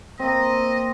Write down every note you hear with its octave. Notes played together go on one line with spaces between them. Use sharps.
A#3 C4 D#5